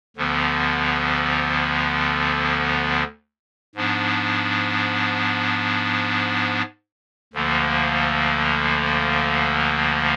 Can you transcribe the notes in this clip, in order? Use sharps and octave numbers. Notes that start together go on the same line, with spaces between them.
D2 D3 F3 B3
G#2 F3 B3 D4
D2 D3 F3 A#3